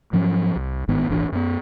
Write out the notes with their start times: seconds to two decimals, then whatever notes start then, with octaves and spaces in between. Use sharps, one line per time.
0.13 G#2 F3 F#3 C#4
0.56 C2
0.88 G1 G#2 D#3 B3
1.08 D#1 G#1 E3 D4
1.32 F#2 B3